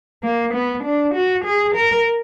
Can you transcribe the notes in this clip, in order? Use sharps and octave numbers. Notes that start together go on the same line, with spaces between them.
A#3
B3
D4
F#4
G#4
A#4